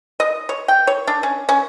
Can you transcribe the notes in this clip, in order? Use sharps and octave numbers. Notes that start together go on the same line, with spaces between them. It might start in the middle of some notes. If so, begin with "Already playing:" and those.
D#5
C#5
G5
C#5
D4
C#4
C#4